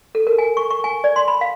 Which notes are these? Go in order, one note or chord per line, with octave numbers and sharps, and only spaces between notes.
A4
A#4
G#5
C#6
C#6
G#5
D5
C6
B5
F5